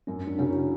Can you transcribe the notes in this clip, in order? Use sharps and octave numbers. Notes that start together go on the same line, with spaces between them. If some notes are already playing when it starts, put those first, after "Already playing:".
F#2 C#4
D4
C#3 F#3 C#4
E4